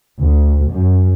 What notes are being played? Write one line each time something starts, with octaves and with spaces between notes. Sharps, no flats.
D2
F#2